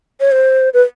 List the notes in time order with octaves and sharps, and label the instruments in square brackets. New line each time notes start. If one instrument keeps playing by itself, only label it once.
[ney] C#5
C5
B4